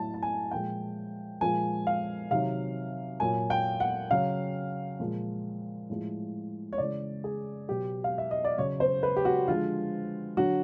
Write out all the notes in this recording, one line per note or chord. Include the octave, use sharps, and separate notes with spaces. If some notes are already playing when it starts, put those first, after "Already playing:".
Already playing: A2 F#3 A5
A5
G#5
A#2 F3 G#3 G5
A#2 F3 G#3 G#5
F5
C3 D#3 F#3 F5
A#2 F#3 G#5
G5
F#5
C#3 F#3 F5
A#2 F3 G#3
A2 F3 G#3
C#5
C#3 E3 G#3 D5
G#4
B2 F#3 G4
F5
E5
D#5
D5
C#3 F#3 C#5
C5
B4
G4
F#4
D3 F3 G#3 F4
D3 F#3 F#4